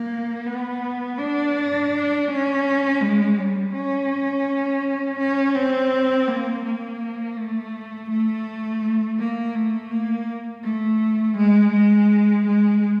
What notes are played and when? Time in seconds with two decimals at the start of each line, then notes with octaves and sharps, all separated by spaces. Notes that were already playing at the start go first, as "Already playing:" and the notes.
Already playing: A#3
0.46 B3
1.18 D4
2.28 C#4
3.01 G#3
3.37 G3
3.73 C#4
5.19 C#4
5.56 C4
6.28 A#3
6.64 A#3
7.37 A3
8.10 A3
9.19 A#3
9.55 A3
9.91 A#3
10.64 A3
11.37 G#3
11.73 G#3
12.46 G#3